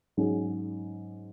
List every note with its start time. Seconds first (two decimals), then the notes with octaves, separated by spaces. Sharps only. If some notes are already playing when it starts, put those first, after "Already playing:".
0.17 G#2 F#3 C#4 G#4